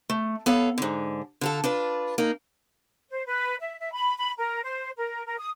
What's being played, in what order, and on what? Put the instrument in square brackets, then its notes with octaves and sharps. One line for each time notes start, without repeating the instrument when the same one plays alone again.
[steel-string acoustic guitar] A3
B3 A4 C#5 F5
G#2 D3
D3 F4 A4
D4 F4 B4
A#3 D#4
[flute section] C5
B4
E5
E5
B5
B5
A#4
C5
A#4
A#4
D#6